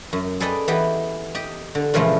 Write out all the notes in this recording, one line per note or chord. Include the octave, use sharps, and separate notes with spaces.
F#2
G#4 A4 B4 D5 D#5 G5
E3 B3 G4 D#5
G4 D#5
D3
A#2 C#3 E3 F3 G#3 A3